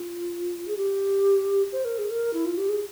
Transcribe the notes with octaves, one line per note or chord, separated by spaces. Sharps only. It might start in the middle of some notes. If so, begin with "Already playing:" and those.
Already playing: F4
G#4
G4
C5
A#4
G#4
A#4
E4
F4
G4
G#4